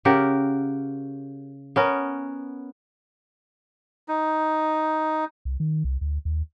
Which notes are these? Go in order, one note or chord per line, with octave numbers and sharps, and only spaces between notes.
C#3 G4 A#4 F#5
B3 C#4 A#4
D#4
C2
D#3
C2
D2
D#2